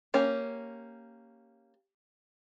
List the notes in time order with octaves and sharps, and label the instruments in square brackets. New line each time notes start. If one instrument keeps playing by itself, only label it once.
[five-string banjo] A#3 C#4 G4